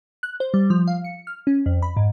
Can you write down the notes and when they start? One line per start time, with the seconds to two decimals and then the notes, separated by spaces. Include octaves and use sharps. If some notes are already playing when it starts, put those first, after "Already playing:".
0.23 F#6
0.40 C5
0.54 G3
0.70 F3
0.87 F5
1.04 C#7
1.27 F6
1.47 C#4
1.66 F2
1.82 B5
1.97 G#2